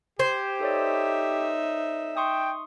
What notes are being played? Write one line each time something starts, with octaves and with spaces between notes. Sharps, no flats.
G4 C5 G#6
D#4 A4 C#5 D5 E5
G5 C6 C#6 D#6